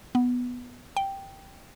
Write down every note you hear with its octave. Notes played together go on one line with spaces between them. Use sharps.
B3
G5